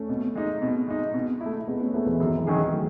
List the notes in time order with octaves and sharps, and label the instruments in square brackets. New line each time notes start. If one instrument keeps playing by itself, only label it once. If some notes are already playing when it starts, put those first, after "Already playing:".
Already playing: [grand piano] A3 C#4
[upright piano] B2
G#3 D#4
B2
G#3 D#4
B2
E4
A3
[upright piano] B2 [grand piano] G#3 B3
[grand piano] A3 C#4
[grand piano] G#3 B3 [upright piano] A3 E4
[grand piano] E3 G#3
[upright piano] F#2 [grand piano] D#3 F#3
[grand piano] E3 G#3
[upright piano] D#3 F#3 C#4 G#4
[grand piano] E3 G#3
F#3 A3